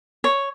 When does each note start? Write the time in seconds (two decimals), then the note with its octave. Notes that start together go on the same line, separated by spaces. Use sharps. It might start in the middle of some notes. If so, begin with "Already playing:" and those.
0.24 C#5